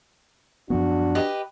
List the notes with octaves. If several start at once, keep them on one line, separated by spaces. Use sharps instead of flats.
F#2 F3 B3 D4 F#4
G4 B4 D#5